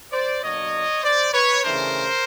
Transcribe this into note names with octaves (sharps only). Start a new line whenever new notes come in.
C5 D5
B2 F#3 A#3 D4 C#5 D#5
C5 D5
B4 C#5
C#3 E3 A3 D4 A#4 C5